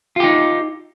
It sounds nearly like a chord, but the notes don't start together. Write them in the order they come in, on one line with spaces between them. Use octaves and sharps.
F4 G4 D#4